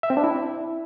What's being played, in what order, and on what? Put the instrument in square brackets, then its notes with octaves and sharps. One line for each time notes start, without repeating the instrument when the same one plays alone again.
[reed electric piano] E5
C4
D4
E4